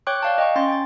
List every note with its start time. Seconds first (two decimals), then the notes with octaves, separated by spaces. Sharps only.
0.07 C#5 G5 C#6 D6 F#6 G6
0.23 D5 F5 A5
0.38 D#5 G5 C#6
0.56 C#4 C6 A6
0.68 G5 A6